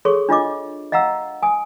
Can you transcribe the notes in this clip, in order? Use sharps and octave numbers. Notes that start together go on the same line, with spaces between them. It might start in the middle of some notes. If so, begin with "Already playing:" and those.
G#4 A4 C#5 C6 C#6
D4 F4 D#5 D6
D#5 F5 F#5 A#5 E6
G#5 D#6